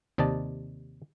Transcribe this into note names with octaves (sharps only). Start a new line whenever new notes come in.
D#2 C3 D5 D#5 A5